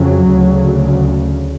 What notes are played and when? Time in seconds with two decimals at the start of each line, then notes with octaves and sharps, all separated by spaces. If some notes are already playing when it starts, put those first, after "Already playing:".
Already playing: F2 C#3 F#3
0.30 D2 C#3